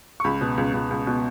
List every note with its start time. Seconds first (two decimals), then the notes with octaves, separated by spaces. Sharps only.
0.20 C#6
0.24 C#2 B5
0.41 B2
0.58 C#2
0.74 C#2
0.91 C#2
1.07 B2